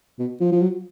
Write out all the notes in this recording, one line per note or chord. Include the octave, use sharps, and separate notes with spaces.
B2
F3
F3
F#3